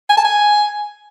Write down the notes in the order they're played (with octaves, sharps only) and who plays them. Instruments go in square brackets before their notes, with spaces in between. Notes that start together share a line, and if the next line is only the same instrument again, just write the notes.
[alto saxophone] G#5
A5
G#5